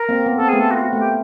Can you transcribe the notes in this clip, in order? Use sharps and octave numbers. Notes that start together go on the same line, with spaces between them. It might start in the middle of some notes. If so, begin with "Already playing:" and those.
Already playing: A#4
A#3 C4
B3
C4 A4
A3 B3 G#4
A4
F#4
F4
F#4
A3 F#4
G4